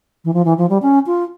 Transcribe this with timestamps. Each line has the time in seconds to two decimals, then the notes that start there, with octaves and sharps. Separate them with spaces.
0.25 E3
0.34 F3
0.45 E3
0.58 F3
0.70 G3
0.82 C#4
1.06 F4